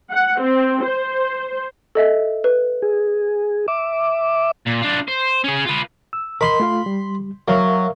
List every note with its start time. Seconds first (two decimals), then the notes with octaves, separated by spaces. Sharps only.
0.10 F#5
0.40 C4
0.83 C5
1.95 A4 D#5 E5
2.44 B4
2.82 G#4
3.68 E5 D6
4.66 A#2
4.82 D4 F4
5.08 C5
5.44 C#4 G#4
5.66 F4 B4
6.13 E6
6.41 A#4 D#5 B5 C6
6.60 A3 F4 F5
6.86 G3
7.48 F#3 A#4 E5 F5